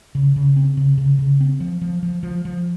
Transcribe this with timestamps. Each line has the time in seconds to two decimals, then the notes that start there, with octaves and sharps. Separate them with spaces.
0.15 C#3
0.36 C#3
0.56 C4
0.77 C#3
0.98 C#3
1.19 C#3
1.41 C4
1.60 F3
1.82 F3
2.03 F3
2.23 F3
2.45 F3